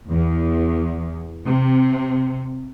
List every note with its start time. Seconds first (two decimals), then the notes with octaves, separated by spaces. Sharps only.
0.10 E2
1.47 C3